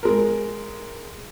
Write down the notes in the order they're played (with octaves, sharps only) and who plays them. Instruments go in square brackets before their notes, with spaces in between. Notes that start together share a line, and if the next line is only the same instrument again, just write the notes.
[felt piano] G#3 A#4